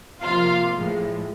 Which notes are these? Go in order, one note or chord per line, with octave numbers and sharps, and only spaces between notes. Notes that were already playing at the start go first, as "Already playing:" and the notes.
C3 F3 A#3 F4 F5
A2 F3 G#3